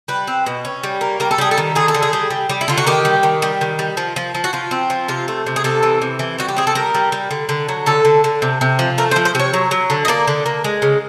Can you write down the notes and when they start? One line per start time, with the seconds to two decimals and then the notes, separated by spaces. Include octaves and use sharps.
0.08 G3 B4
0.27 C4
0.46 B2
0.65 C#4
0.83 G3
1.01 A#3
1.20 G3 A#4
1.31 A4
1.38 G3 G#4
1.51 A4
1.58 D#3
1.75 D3 G#4
1.88 A4
1.94 D3
2.02 G#4
2.13 G3
2.30 G3
2.50 G3
2.61 E4
2.68 D3 F4
2.77 F#4
2.87 D#3 G4
3.05 G3
3.23 D#3
3.42 G3
3.61 D#3
3.79 G3
3.97 F3
4.16 F3
4.35 F3
4.44 F#4
4.53 F3 F4
4.71 C4
4.90 F3
5.08 C3 F4
5.28 A3
5.46 C3
5.56 G#4
5.64 C3 A4
5.83 E3
6.01 C3
6.19 E3
6.38 G3 F#4
6.48 G4
6.56 C4 G#4
6.67 A4
6.75 G3 A#4
6.94 G3
7.12 G3
7.31 D3
7.49 D3
7.69 F#3
7.86 D3 A4
8.05 D3
8.24 D3
8.42 C3
8.61 C3
8.79 F3
8.98 A3 A#4
9.11 C5
9.16 F3
9.25 C5
9.35 C3 C#5
9.53 F#3
9.71 F#3
9.90 D3
10.05 D#5
10.08 A#3 D5
10.27 D3
10.46 A#3
10.64 G#3
10.82 C#3